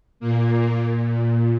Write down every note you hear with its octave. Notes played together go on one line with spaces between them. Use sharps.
A#2 A#3